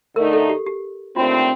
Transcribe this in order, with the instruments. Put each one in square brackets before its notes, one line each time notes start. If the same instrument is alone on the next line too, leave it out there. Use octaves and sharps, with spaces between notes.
[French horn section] D3 A3 D#4 [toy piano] A#4
[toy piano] A4
G4
G4
[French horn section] D#2 D3 A3 C4 [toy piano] F4
[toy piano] F4